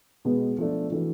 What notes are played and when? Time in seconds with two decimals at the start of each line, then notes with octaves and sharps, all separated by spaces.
0.25 B2 G#3 B3
0.58 F3 A3 D4
0.92 E3 A3 D4 F#4